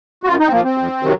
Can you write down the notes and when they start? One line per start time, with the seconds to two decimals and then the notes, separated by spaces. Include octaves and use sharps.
0.23 F#4
0.27 F#2 F4
0.39 D#4
0.47 C4
0.52 F3 A#3
0.64 C4
0.78 F2
1.03 C3 D#3 F#3